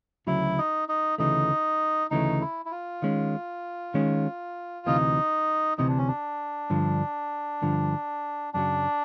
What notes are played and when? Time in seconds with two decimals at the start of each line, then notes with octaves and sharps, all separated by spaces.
0.27 D2 C#3 F#3 E4
0.58 D#4
0.88 D#4
1.18 D2 C#3 E3 A3 D#4
2.11 D2 C#3 E3 A3 D#4
2.41 E4
2.65 E4
2.72 F4
3.02 D#3 G#3 C#4
3.94 D#3 G#3 C#4
4.86 D2 C3 E3 D#4
5.78 D2 C3 E3 D#4
5.88 D4
5.98 C#4
6.08 D4
6.70 G2 D3 F3
7.62 G2 D3 F3
8.54 F#2 C#3 F#3 D4